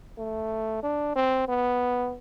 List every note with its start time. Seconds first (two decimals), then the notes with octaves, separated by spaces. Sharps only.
0.18 A3
0.83 D4
1.15 C4
1.48 B3